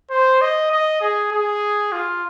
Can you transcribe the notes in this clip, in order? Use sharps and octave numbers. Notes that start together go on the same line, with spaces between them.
C5
D#5
D#5
G#4
G#4
F4